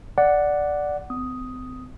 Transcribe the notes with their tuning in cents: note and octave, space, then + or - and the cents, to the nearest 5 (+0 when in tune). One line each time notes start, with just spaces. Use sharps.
D5 +0 F#5 +0
C4 -45 D#6 +5